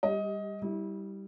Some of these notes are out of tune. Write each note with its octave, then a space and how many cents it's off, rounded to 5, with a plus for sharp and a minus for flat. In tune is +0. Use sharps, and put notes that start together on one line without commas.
G3 +20 G4 -5 D#5 +20
G3 +0 E4 -30